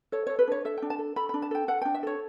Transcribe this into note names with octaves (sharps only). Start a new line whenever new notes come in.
A4 C#5
A4 C#5
B4
D4 C#5
A4 E5
D4 G5
A5
A4
A4 B5
D4 B5
A5
A4 G5
A4 F#5
D4 G5
E5
A4 C#5